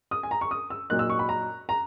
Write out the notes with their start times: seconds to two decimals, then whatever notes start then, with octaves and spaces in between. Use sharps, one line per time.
0.11 D#6
0.23 G#5
0.31 A#5
0.41 C#6
0.51 D#6
0.70 E6
0.90 A#2 F#3 A#3 D#4 F#6
0.99 E6
1.10 C#6
1.19 B5
1.29 A#5
1.69 A#5